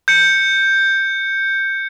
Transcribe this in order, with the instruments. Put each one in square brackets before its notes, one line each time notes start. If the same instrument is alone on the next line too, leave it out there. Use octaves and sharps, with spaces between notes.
[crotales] G6 C#7